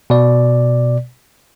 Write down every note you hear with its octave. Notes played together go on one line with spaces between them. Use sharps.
B2 D5